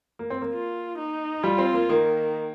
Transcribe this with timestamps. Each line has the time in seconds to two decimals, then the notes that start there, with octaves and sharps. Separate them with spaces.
0.19 A#3
0.30 C4
0.42 A#3
0.54 F4
0.98 D#4
1.43 G3 F4
1.58 C4
1.74 A#3
1.90 D#3 A#3